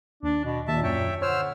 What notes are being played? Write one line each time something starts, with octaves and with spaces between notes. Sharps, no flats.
D#2 D4
B2
D#2 A#2 E5 A5
F#2 C#5 E5 G5
D3 C5 C#5 E6 F6